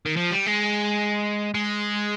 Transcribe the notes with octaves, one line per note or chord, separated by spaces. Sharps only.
D#3
F3
G3
G#3
G#3